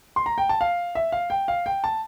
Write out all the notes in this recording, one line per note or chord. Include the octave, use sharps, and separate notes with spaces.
C6
A#5
G5
A5
F5
E5
F5
G5
F5
G5
A5